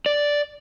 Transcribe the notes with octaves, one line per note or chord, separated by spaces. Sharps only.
D5